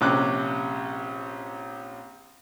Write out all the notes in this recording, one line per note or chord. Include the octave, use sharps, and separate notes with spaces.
A#1 C3 C#4 D6 F#6